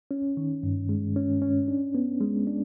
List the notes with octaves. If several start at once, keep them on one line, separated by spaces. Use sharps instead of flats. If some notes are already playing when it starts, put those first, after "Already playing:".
C#4
D#3
G2
G#3
C#4
C#4
D4
B3
G#3
D4